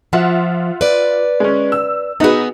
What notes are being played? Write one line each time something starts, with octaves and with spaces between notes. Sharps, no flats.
F3 F4 E5 F#5
B4 D5
G#3 C#4
E6
B3 D#4 F#4 G#4 B4